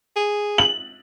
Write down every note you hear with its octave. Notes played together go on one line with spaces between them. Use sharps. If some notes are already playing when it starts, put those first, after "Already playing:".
G#4
F#7